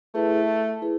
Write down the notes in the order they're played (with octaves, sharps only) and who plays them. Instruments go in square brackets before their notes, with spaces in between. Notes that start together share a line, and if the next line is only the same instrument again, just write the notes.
[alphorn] A3 [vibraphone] E4 G#4 B4
[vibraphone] E4 G#4 B4